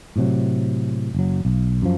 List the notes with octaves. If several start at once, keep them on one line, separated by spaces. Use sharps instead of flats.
A2 C3 F#3
F#1 F#3
B1
F#2 F3